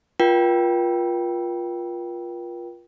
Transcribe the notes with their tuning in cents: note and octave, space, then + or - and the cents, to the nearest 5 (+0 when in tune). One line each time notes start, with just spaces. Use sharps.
F4 +0 A#4 +45 G5 -10